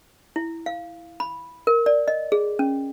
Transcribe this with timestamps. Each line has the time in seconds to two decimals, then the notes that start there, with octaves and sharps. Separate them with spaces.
0.36 E4
0.66 F5
1.20 B5
1.67 A#4
1.86 D5
2.08 D#5
2.32 G#4
2.59 C#4